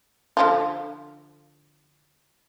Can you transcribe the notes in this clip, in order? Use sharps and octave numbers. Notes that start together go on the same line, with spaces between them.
D3 F3 F4